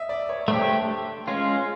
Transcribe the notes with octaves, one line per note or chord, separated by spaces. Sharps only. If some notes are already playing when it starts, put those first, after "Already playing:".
Already playing: D#5 E5
D5
C#5
A3 D4 G4 C5
G#3 C#4 F4 C#5